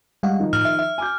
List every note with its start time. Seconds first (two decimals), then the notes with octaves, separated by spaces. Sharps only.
0.23 G3 G#3 F5 F#5
0.39 D#3 F3 D#4
0.53 A2 F6
0.65 E5
0.79 E5
0.98 G#5 D6 G6